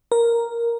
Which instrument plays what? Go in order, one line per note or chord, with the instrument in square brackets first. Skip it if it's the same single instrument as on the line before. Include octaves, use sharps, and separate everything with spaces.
[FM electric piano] A#4